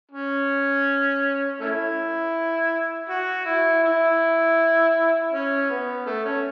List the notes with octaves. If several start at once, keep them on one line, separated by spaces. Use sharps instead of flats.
C#4
A3 C#4 E4
F#4
E4
E4
C#4
B3
A3
C#4